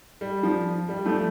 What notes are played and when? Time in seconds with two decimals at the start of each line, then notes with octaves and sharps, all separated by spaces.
0.21 G3
0.43 F3
0.89 G3
1.05 F3 A3